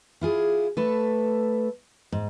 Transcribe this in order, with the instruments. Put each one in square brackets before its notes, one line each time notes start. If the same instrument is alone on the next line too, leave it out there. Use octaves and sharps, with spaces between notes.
[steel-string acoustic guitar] E4 F4 G#4
A3 A4 B4
G#2